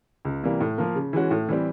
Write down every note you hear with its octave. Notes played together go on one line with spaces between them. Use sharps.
C#2
C3 E3 G3 A#3
A2
F3 A#3
C#3
E3 G#3 C#4 F#4
A2
E3 G3 C4